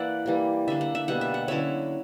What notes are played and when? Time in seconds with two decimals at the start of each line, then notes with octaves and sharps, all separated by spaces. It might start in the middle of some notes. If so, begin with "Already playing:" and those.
Already playing: E3 A#3 E4 D5 E5 F#5
0.26 E3 G3 A#3
0.68 D3 A#3 D4 E5
0.81 F#5
0.95 E5
1.08 B2 G3 A#3 F#5
1.21 E5
1.34 F#5
1.48 D3 F#3 C#4 E4 C#5 E5